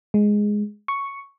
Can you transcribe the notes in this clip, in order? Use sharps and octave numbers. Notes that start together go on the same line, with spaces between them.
G#3
C#6